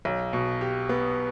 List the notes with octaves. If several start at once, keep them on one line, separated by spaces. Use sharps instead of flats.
B1
B2
G4
B3